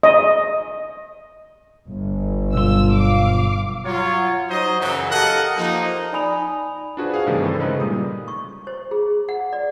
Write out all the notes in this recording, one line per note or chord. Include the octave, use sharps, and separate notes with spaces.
D#5
G1
B1 G2 F4 E6
F5 D6
F#3 F4 C#5
F#3 D#4 C5 D#5
F#2 C#3 E3 F#3
G4 A4 A#4 D#5 F5 F#5
F3 A#3 D#4
D#4 D5 G#5 B5 D#6 F7
D4 F4 F#4 G#4 B4 C5
G#4 F5
G2 C3 D#3 E3 A3
E4 A4 C5
C#3 G#3 D#4 B4
A#2 G3 D#6
C#6
C5
G#4
F#5
D5